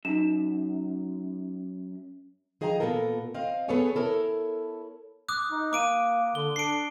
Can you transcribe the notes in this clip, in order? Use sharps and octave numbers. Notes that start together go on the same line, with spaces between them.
F#2 D#4 E7
F3 G#4 D#5 G5 A5 A#5
A#2 D#3 B3 F4 A4 A#4
C4 D#5 F5
B3 G#4 A4 C#5 G#5
E4 A4 A#4 C#5
D6 D#6 F#6
D#4
A#3 D6 D7 D#7
D3 G7
D4 C7 D7